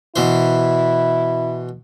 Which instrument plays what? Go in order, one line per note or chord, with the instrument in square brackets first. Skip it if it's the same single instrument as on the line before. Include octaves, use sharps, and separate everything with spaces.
[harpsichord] B2 E3 C5 [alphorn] E4